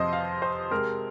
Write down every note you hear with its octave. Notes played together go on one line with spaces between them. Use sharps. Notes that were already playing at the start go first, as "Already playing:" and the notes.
Already playing: F2 C3 F3 C5 D#5
F5
C5
C3 G#3 C4 A#4